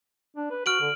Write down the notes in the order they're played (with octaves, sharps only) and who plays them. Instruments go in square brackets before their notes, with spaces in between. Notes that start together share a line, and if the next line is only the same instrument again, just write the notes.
[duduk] D4
B4
[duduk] F#4 [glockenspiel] F6 D7 F#7
[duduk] D3